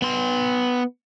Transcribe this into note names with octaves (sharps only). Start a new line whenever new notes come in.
B3 C6